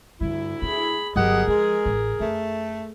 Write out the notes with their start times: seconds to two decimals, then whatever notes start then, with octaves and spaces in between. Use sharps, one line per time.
0.21 D2 G2 D3 E4
0.62 A3 G#4 B5
1.16 G1 F#3 G4 G#4 A#4 D#5 F#5
1.47 F3 G#3
1.86 A1
2.20 F#2 A3